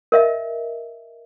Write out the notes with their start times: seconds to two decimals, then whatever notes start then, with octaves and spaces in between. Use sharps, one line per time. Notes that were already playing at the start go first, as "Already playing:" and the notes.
0.12 A#4 D#5 E5